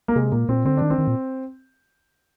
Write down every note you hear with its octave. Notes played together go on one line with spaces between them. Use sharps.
A#3
C3 G#3
A#2 A#3
A#2 C4
D3 C4
D#3 D4
C4
D#3
A#2